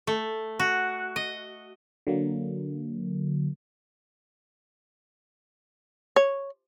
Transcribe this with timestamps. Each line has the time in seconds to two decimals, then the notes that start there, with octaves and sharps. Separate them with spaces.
0.07 A3
0.59 F#4
1.16 D#5
2.07 D3 F#3 A#3
6.16 C#5